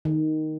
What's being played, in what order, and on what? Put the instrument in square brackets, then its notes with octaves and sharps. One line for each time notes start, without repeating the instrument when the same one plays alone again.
[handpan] D#3